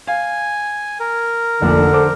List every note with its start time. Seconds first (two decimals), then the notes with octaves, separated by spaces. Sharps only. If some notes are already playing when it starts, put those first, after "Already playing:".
0.07 F5 G#5
1.00 A#4
1.62 F1 A#1 D3
1.93 A4 C5 D6